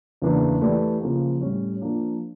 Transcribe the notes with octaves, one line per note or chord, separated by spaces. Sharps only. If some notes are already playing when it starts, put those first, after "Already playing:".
E2 C#3 E3 A#3 D4
E3 A3 E4 G4 D5
C#3 F3 A#3
A2 G3 C#4
F3 A#3 D4